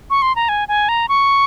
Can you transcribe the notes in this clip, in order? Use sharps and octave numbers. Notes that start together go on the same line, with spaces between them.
C#6
C6
A#5
G#5
G#5
A#5
C#6